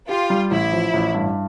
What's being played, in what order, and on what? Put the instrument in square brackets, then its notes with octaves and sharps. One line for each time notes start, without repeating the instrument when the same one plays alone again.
[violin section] F4 [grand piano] G4
[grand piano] G3
[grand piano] A1 [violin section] E4
[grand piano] F3
A1
G2